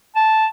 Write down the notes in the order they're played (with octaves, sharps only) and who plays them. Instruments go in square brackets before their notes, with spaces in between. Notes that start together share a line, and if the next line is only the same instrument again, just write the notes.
[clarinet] A5